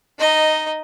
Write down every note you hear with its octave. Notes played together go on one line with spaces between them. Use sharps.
D#4 D#5